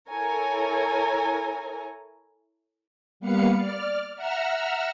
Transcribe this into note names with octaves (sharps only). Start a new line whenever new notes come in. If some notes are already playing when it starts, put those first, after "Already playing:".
E4 A4 A#4 C#5 G#5 A#5
G3 A#3 B3 B4 F5 C#7
D5 F6
E5 F#5 A#5 E6 F6